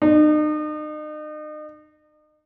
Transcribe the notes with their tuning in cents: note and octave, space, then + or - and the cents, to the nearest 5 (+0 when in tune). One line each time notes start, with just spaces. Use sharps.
D#4 -40